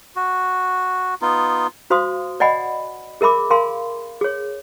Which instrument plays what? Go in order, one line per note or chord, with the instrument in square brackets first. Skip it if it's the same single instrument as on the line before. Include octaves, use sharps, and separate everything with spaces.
[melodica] F#4
B3 D#4 F4
[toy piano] F#4 C5 F5 C6 D#6
D5 D#5 F#5 G#5 B5
G#4 A#4 E5 B5 D6
A#4 F5 G#5 C6
G#4 C#5